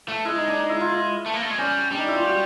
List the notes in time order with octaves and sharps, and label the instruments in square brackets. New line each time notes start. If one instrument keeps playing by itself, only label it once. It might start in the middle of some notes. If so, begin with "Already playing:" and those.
[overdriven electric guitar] A3
[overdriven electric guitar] G#3 [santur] E4
[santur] D#4
D4
D#4
E4
F4
E4
[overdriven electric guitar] A3
A#3
A3
G#3
[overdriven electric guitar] G3 [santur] C#4
[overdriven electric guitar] G3 [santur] D4
[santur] D#4
E4
F4
F#4